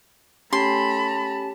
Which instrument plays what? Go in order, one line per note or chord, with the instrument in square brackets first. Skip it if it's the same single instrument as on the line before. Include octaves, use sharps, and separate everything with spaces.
[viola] A3 B5 [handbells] C#4 G4 [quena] A5 [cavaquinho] C6